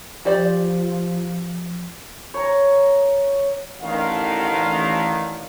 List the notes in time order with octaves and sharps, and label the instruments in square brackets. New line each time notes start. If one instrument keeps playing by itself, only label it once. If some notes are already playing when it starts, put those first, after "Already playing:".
[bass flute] F3 [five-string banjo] G4 C5 D5
[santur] C#5 A#5
[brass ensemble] A1 D3 D#3 F5